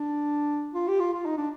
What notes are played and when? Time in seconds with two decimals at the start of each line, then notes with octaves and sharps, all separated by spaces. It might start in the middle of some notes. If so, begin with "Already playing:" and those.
Already playing: D4
0.74 F4
0.88 G4
1.00 F4
1.14 F4
1.26 D#4
1.37 D4